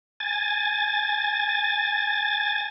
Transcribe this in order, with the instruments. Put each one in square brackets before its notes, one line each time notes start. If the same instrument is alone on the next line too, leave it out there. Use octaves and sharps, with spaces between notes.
[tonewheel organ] G#5 A6